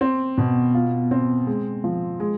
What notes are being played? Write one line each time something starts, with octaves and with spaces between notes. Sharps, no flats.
C4
B2
F4
C4
G#3
F3
G#3